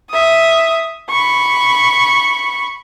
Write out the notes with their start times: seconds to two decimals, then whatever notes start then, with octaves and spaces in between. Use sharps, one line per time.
0.11 E5 D#6
1.10 B5 C#6